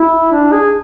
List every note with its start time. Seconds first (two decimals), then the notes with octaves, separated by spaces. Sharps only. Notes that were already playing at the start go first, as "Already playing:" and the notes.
Already playing: E4
0.32 D4
0.52 G#4